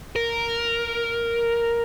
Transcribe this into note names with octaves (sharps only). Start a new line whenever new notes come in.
A#4